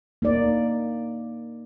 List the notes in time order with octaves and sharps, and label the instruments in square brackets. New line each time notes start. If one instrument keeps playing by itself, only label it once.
[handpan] A#3 D#4 D5